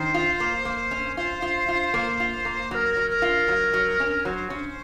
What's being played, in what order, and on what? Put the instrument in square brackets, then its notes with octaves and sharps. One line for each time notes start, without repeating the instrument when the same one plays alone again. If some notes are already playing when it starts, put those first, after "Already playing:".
Already playing: [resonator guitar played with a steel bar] D#3 [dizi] C5
[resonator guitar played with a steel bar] F4
A#3
A#3
C#4
[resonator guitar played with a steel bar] F4 [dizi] C5
[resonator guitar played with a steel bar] F4
F4
A#3
F4
A#3
[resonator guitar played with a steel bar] F#3 [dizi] A#4 C5
[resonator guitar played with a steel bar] F#3
[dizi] A#4
[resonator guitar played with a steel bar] F4
F#3
F#3
C#4
[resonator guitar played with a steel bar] F#3 [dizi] C5
[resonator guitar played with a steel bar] C#4